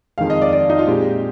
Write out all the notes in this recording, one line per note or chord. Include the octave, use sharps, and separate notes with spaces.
F2 D#3 G#3 F5
D#5
D5
D5
D#4
F4
A#2 G#3 C4 G4